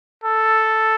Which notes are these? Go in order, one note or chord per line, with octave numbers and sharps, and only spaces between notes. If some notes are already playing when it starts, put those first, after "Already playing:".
A4